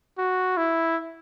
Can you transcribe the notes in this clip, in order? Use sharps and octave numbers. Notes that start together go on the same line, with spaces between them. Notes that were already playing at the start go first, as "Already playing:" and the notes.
F#4
E4